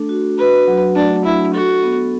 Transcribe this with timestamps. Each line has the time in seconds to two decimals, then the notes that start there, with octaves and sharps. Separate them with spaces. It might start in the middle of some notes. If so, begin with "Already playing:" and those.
Already playing: A3 D4 A4
0.09 F#4
0.38 F#4 B4
0.68 F#3
0.96 A3 D4
1.25 D4 E4
1.54 F#4 A4
1.83 B3